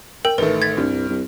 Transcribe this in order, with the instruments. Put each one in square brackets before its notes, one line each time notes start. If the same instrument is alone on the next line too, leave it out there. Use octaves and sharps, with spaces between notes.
[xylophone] A#4 [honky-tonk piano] G5
[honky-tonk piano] A1 D#3 A3 [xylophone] B4
[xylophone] G#6 A6 B6
[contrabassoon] C2 [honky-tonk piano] G2
[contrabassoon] C2